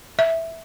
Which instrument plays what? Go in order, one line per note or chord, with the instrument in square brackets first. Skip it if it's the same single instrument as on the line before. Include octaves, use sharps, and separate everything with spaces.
[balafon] E5